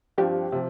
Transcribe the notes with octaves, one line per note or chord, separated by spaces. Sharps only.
G2 F3 C4 F4 G4
C3 F3